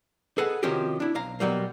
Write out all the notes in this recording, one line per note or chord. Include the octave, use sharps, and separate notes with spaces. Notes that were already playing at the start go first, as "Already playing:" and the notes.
G#4 A4 B4 D#5 F#5
C3 D#3 F3 C#4 F#4 G4
D4 E4
B1 F5 A#5
B2 F#3 G3 A#3